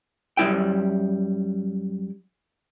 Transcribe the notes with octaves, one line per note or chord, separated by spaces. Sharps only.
F#2 G3 E4 E5 G5